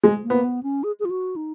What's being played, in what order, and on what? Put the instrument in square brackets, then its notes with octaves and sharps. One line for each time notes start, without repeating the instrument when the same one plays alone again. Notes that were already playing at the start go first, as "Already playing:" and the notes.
[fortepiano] G#3
[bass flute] A#3
[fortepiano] B3
[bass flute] B3
C#4
G#4
G#4
F4
F#4
D#4